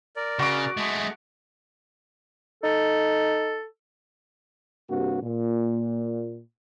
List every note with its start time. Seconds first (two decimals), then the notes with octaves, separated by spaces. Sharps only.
0.16 A#4 D5
0.39 C#3 F#4 D6
0.77 G#3 A3 D#5
2.63 D#4 A4
4.90 G2 C3 A#3 F#4
5.22 A#2